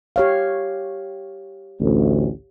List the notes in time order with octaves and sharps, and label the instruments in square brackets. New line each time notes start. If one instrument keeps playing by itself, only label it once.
[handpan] G4 C#5 F5
[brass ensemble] A1 D2